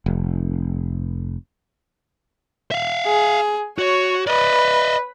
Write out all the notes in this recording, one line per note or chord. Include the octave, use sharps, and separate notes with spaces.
F1
E5 F5
G#4
F#4 C#5
B4 D5 D#5